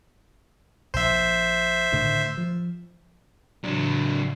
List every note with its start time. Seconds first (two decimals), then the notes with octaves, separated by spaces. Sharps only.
0.94 A#1 C5 E5
1.92 A2 D3 D#3
2.37 F3
3.64 A2 C#3 E3 F#3 D4